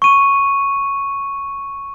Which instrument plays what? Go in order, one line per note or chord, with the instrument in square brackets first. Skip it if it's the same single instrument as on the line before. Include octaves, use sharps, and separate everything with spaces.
[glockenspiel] C#6 D#7